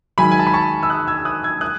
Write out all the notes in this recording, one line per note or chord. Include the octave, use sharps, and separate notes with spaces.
G#2 D#3 F#3 G#5 B5
G#5
A5
B5
A5 C#6
E6
D#6 F#6
E6 G#6
D#6 F#6
E6 G#6
D#6 F#6